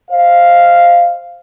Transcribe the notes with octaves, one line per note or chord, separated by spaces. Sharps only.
C5 D#5 F5